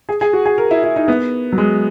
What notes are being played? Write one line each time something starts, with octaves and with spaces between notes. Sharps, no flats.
G#4
G#4
F#4
G#4
A#4
E4
E4
D#4
B3
F#3
G#3